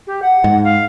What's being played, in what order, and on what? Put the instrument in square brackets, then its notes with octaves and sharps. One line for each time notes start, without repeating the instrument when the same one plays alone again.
[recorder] G4
F#5
[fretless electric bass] G#2
[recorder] F5